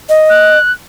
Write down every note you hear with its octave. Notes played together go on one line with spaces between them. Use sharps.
D#5
F#6